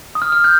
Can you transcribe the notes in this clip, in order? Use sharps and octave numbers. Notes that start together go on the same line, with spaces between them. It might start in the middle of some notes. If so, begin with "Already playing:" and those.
D#6
F6
F6
G6